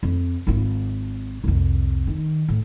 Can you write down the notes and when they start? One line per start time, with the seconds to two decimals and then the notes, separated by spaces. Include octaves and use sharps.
0.03 F2
0.47 G#1 F4
1.44 C2 F2
2.07 D#3
2.48 A2